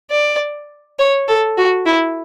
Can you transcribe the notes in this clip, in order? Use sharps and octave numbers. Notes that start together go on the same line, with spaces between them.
D5
C#5
A4
F#4
E4